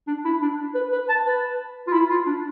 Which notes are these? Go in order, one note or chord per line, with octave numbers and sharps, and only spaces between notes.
D4
E4
D4
B4
B4
A5
B4
F4
E4
F4
D4